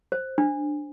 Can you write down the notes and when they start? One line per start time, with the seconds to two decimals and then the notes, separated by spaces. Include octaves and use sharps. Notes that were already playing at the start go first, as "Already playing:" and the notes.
0.12 C5
0.38 D4